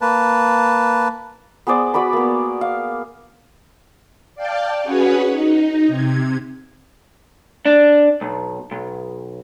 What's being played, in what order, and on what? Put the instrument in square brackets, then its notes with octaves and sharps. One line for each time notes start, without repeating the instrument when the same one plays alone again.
[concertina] A#3 B4 A5
[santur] B3 G#4 C5 D5
F#4 B4 D5 B5
A#3 B3
F5
[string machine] D5 F5 G5 A5
C#4 F#4 G#4 B4 C#5
D#4
C3 G#6
[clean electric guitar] D4
B1
B1